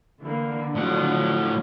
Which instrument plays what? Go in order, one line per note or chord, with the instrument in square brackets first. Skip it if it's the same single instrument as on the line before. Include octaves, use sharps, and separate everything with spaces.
[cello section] D3 [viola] E3 A#3
[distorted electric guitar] A2 F#5 [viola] F3 F#3